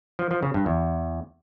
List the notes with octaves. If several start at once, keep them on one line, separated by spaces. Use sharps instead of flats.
F3
F3
C#3
G2
E2